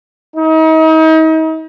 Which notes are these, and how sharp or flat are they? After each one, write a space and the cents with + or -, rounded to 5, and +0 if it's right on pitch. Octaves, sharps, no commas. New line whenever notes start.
D#4 +40